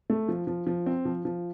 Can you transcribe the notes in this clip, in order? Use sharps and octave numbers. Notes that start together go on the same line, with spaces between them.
A3
F3
F3
F3
C4
F3
F3